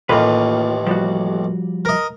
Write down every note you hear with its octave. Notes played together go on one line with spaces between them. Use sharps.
A1 D#2 A#3 F4 B4
F3 G3 F#4
A#4 D#5